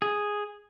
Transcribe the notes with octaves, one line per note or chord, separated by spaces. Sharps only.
G#4